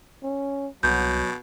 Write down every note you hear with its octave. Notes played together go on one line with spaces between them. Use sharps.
C#4
C2 B2 F#3 G6